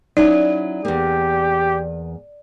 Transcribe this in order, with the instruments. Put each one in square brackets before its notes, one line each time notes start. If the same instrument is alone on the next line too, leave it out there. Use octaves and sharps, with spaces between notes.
[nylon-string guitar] F#3 C#4 E4 [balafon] D#4 [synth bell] D5
[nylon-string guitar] E2 A#3 [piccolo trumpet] G4